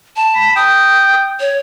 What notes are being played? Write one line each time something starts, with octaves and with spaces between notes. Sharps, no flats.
A5
B5
G5 D#6
C#5